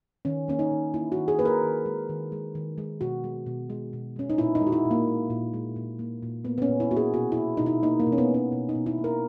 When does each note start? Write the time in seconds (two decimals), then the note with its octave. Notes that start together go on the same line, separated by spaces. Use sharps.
0.25 D#3 C#4
0.48 A#3 C#4
0.59 D#4
0.71 D#3
0.94 A#3 E4
1.12 D#3 F#4
1.28 G#4
1.39 A#3 B4
1.45 A#4
1.63 D#3
1.85 G#3
2.09 D#3
2.32 G#3
2.55 D#3
2.78 G#3
3.01 B2 F#4
3.24 G#3
3.46 B2
3.70 G#3
3.93 B2
4.16 G#3 C#4
4.30 D#4
4.38 A#2 E4
4.55 D#4
4.61 G#3
4.67 F#4
4.72 E4
4.85 A#2
4.91 A#3
5.07 G#3
5.30 A#2
5.54 G#3
5.76 A#2
5.99 A#3
6.23 A#2
6.45 A#3 B3
6.58 B3
6.62 C#4
6.69 A#2
6.80 E4
6.91 A#3 F#4
6.97 G#4
7.14 B2 F#4
7.32 E4
7.37 A#3
7.57 B2 D#4
7.66 E4
7.83 A#3 D#4
8.00 A#3
8.06 B2
8.12 C#4
8.18 B3
8.29 A#3
8.34 C#4
8.52 B2
8.69 D#4
8.75 B2
8.86 E4
8.98 A#3
9.04 A#4